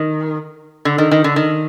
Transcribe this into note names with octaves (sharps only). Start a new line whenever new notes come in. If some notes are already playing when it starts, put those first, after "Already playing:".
Already playing: D#3
D3
D#3
D#3
D3
D#3